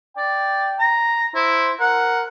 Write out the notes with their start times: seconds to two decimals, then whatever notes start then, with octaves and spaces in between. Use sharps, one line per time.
0.17 D5 G5
0.79 A#5
1.35 E4 C5
1.81 A#4 F#5